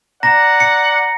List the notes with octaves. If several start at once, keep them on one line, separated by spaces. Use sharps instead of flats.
D5 F#5 A#5 A#6
C#7